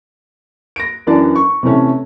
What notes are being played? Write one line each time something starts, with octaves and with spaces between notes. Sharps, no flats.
A#6 D7
F#2 E3 D4 D5 A5
C#6
C3 E3 A3 C#4